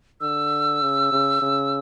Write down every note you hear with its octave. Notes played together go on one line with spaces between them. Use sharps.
D3 E6
C#3
C#3
C#3